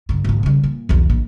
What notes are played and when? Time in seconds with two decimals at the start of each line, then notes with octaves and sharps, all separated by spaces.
0.09 G2 D3
0.24 G#1 A#2
0.43 C#3 G3
0.63 A#2
0.89 B1 E2
1.10 A#1